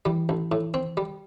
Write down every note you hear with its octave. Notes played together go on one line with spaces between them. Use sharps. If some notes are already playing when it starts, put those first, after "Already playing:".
E3 G3
A1
A2
C4
G3